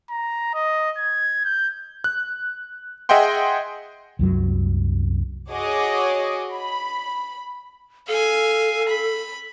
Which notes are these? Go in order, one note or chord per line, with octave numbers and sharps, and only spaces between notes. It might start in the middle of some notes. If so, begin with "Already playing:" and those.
A#5
D#5
G#6
G6
F#6
G#4 D#5 E5 F#5 G5 C6
C2 F#2 F#3
F#4 G#4 C#5 D#5 D6
B5
A4 F5 G#5
B5